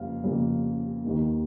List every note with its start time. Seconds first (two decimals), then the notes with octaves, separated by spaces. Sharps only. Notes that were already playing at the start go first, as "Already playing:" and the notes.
Already playing: F2 C#3 A#3 F5
0.24 F2 C#3 F3 A#3
1.04 D#2 D#3 A#3